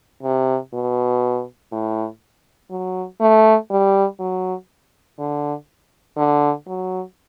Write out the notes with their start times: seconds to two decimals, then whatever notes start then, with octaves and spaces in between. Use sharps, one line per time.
0.23 C3
0.73 B2
1.72 A2
2.70 F#3
3.20 A3
3.70 G3
4.20 F#3
5.19 D3
6.17 D3
6.67 F#3